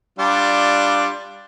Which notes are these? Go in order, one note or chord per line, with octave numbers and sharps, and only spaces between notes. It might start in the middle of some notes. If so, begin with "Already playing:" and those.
G3 D4 F4